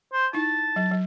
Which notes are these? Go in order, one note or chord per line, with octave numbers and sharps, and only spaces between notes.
C5
D#4 E4 A5
F#3
F#3